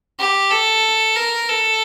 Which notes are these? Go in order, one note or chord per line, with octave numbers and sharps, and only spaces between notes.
G4
A4
A#4
A4